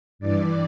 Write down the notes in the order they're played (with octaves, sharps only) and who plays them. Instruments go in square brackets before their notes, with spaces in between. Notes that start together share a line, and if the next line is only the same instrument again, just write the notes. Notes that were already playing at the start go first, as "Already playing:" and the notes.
[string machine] G2 E3 D5